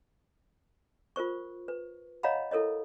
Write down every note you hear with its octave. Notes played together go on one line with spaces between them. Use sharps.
F4 A#4 C5 C#6
B4
C#5 D#5 F5 F#5 A#5 B5
E4 A4 A#4 C#5 D#5